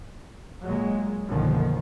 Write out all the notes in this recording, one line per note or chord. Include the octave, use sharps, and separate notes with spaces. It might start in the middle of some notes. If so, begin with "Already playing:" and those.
A#2 F#3 G#3
B1 F#2 D3 D#3 F3 A#3